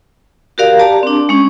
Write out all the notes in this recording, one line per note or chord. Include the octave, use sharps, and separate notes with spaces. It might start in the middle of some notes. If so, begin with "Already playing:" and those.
F#4 G4 A#4 D5 F5
G4 D5 A5 A#5
C4 D4
G#3 C#4